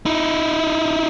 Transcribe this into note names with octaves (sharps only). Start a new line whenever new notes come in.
D#4 E4